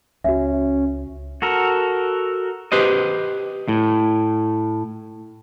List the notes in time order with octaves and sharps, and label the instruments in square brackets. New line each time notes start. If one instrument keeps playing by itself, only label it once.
[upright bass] C#2 [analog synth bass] C#4 [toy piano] F#4 E5
[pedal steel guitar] F#4 A4 A#4
[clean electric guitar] G4 B4 C5 D#5
A2